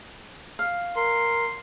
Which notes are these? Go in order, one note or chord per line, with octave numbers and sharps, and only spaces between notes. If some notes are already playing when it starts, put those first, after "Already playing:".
F5
A#4 C6